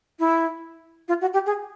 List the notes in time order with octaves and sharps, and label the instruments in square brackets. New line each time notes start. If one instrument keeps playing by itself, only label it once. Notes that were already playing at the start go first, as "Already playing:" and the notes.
[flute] E4
F4
F#4
G4
G#4